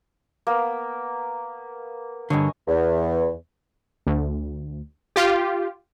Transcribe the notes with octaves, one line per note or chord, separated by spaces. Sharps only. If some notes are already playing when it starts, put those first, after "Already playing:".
A#3 B3
G2 D3 C#5 D#5 G#5
E2
D2
F4 G4